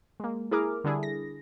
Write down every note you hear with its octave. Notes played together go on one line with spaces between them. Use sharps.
G#3 A#3
E4 G#4 A#4 D6 F6
D3 G3 D4 E4 G#4
A#6